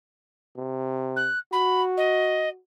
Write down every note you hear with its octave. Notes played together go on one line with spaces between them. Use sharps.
C3
F#6
F#4 B5
D#5